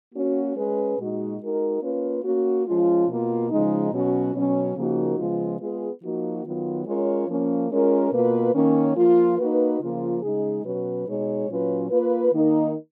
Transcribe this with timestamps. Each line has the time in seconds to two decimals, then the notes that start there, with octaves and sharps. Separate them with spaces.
0.14 A#3 C#4 F#4
0.56 G#3 C#4 G#4 B4
0.98 A#2 G#3 D#4 F#4
1.41 G#3 D#4 F#4 A#4
1.82 A#3 C#4 F4 B4
2.24 A#3 C#4 F#4
2.66 F3 G#3 C#4 F4
3.08 B2 A#3 F4
3.50 C#3 F3 G#3 D#4
3.92 B2 F#3 C#4 F#4
4.34 B2 F#3 C#4
4.76 C#3 F3 A#3 D#4 F#4
5.18 C#3 F3 G#3 B3 F4
5.60 G#3 B3 F4 G#4
6.03 F3 A#3 D#4 F#4
6.44 D#3 F#3 B3 F4
6.86 G#3 C#4 F4 A#4 C#5
7.28 F3 A#3 C#4
7.70 G#3 C#4 F4 A#4
8.12 B2 A#3 F4 B4
8.54 D#3 A#3 C#4
8.96 F3 A#3 F4
9.39 A#3 D#4 F#4 B4
9.80 C#3 F3 A#3 F4
10.22 C#3 G#3 D#4 G#4
10.65 B2 F#3 C#4 F#4 B4
11.07 B2 G#3 D#4 G#4 C#5
11.49 A#2 F#3 C#4 F4 B4
11.90 A#3 F4 B4
12.32 D#3 A#3 D#4 A#4